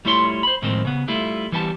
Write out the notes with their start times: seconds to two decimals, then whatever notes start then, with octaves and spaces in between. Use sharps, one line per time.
0.05 G3 A3 E4 F4 C#5 C6
0.43 C5 B5
0.62 A2 D#3 F3 G#3 C4
0.85 C#3 B3
1.08 G3 A3 E4 F4
1.52 E3 G3 B3 G4 G#5 A5